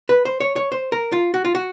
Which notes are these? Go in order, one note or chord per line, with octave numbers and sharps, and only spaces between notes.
B4
C5
C#5
C#5
C5
A#4
F4
F#4
F4
F#4